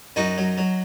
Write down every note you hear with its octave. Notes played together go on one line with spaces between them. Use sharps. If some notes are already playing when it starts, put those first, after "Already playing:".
F#2 D#4 F#4
F#3
F#3